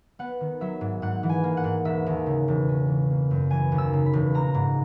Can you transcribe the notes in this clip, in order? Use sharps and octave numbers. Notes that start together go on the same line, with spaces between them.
B3 F#5
D#3
F#3 E5
G#2
G#2 F#5
E3
G#5
A#3
F#5
G#2
E1 E5
D#2
C#3
E1
C#4
E3
A#3
F#2
E3 G#5
D#2
E6
C#3
B5
E1
A#1 A#5
G#2